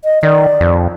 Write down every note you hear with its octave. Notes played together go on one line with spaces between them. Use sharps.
D#5
D#3 D5
F2